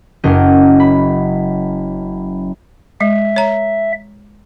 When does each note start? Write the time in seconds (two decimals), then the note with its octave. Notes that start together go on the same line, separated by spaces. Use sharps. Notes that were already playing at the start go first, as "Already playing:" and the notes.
0.24 F#1 F#3 C#4 A#4 D#5 G6
0.80 B5
3.01 G#3 E5
3.36 C#5 A#5